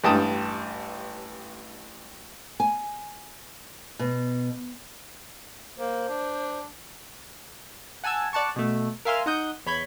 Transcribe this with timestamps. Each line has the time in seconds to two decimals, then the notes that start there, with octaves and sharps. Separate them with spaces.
0.04 A1 G2 G5 A5 D#6
2.60 G#5
3.99 B2
5.78 A#3 C5
6.08 D4
8.04 F#5 G#5 A5 E6 G#6
8.33 D5 F#5 A5 C#6
8.56 B2 A3
9.05 A#4 E5 F5 G#5 C6 F6
9.26 D#4 F#5 D#6 G6
9.66 E2 C#5 B5 G6 G#6